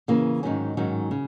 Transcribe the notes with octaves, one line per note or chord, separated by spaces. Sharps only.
C#3 E3 A#3
G#2 D#3 F#3 C#4
G#2 D#3 F#3 C#4
C#3